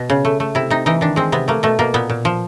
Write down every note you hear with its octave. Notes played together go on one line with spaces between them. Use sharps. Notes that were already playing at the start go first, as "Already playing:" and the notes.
Already playing: B2
C#3
A3
A3
C3 E4
C3 D#4
E3 D#4
D#3 D4
G#3 C4
C3 B3
A3 A#3
B2 A3
B2 A#3
A#2 B3
A#2
F3